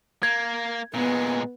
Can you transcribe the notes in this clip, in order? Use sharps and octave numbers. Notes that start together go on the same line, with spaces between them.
A#3 G#6
A#2 G#3 B3